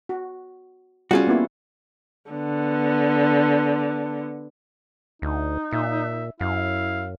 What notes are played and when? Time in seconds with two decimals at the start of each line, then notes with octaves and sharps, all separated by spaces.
0.09 F#4
1.11 G3 C#4 F4 F#4 G#4
1.27 A#3 B3 E4
2.31 D3 B3
5.22 D2 D#4
5.73 A#2 E5
6.40 F#2 E4 F5